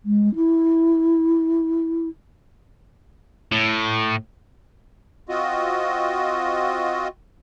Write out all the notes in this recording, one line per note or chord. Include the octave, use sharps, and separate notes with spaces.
G#3
E4
A2
C4 F4 F#4 D#5